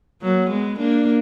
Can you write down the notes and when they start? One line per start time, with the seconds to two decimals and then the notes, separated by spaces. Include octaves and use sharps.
0.22 F#3 A#3
0.51 G#3 B3
0.79 A#3 D4